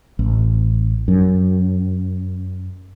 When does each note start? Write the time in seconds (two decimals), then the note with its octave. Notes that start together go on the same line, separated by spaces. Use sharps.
0.19 A1
1.08 F#2